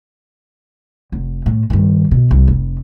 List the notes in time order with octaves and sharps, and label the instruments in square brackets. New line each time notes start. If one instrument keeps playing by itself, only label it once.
[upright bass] F1
A2
G2 D#3
B2
C2
F1